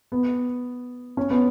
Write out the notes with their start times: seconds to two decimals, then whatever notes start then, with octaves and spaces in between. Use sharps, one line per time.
0.12 B3
1.17 C#4
1.30 B3